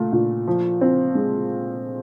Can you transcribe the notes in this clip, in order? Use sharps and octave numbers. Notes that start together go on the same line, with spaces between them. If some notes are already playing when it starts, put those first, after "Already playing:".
Already playing: A#2 A3
A#2
F3
C4
G#3